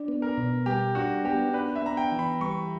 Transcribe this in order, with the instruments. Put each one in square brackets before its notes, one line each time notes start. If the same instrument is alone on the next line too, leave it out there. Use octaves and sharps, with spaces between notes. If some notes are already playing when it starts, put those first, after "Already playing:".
Already playing: [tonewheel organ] D4
B3
[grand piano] A#4
[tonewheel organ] B2
[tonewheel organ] G3 [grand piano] G4
[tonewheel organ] D4 [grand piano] F#4
[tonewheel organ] B3 [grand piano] G4
[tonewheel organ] D4 [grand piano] B4
[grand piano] E5
[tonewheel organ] B3 [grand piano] A#5
[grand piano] G5
[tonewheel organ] E3
[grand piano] B5
[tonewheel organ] G3 [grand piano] C#6